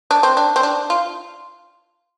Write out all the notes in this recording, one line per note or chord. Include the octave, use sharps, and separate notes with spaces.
D4
C4
D4
C4
D4
F4